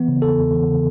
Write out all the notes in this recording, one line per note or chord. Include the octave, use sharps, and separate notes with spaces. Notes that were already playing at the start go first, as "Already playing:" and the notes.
Already playing: E3 B3
C#3
E2 A4
E2
E3
C#3